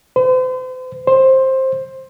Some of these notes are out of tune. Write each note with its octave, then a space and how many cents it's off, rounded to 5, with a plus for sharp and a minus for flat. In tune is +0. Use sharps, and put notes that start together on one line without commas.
C5 -40
C5 +15